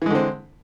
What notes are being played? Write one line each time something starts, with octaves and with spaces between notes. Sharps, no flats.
D3 E3 G#3 C4